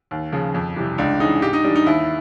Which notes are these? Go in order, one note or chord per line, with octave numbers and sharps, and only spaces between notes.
D#2
C#3 F3
F2
C3 E3 G3
C#2 D4
C#3 E3 D#4
G#2 G4
D#4
E3 G3 D4
D#4
D#2 E4